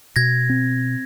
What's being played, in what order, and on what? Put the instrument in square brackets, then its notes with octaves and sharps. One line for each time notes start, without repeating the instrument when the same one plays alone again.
[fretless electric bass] B2 [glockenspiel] G#6 A#6
[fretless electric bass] C4